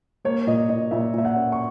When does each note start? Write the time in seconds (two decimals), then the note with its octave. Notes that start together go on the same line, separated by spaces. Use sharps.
0.25 A#3 C#5
0.47 A#2 D#5
0.69 A#2 D#5
0.91 A#2 E5
1.14 A#2 E5
1.25 F#5
1.36 C#4
1.52 C#6